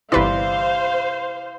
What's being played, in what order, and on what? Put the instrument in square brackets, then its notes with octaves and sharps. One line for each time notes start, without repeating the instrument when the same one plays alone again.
[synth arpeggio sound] G1 B4 D5 [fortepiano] C3 E3 [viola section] C5 [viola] F5